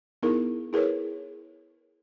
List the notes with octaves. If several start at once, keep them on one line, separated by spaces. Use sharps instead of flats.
B3 D#4 E4 G#4 A#4
E4 G#4 A#4 B4 C#5